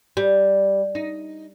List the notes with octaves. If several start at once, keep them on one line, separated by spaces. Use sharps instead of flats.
G3
D#4